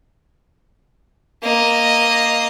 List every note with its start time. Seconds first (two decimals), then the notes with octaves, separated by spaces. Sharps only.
1.43 A#3 D#5